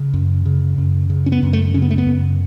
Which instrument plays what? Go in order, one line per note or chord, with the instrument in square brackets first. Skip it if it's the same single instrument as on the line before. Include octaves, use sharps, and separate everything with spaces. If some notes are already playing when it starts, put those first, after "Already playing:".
Already playing: [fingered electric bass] C#3
F#2
C#3
F#2
C#3
C#4
B3
F#2
A3
C#3 C#4
B3
A3
B3
F#2